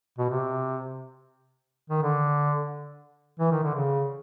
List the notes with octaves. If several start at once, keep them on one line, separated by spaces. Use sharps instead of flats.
B2
C3
D#3
D3
E3
D#3
D3
C#3